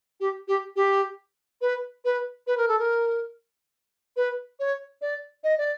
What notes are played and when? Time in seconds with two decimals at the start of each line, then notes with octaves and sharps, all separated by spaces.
0.20 G4
0.48 G4
0.76 G4
1.61 B4
2.05 B4
2.47 B4
2.57 A#4
2.68 A4
2.79 A#4
4.16 B4
4.59 C#5
5.01 D5
5.44 D#5
5.58 D5